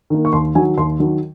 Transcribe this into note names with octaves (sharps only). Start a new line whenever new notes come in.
D#3 A#3
C#6
D#2 C6
D#3 F#3 G#5
D#2 C6
D#3 F#3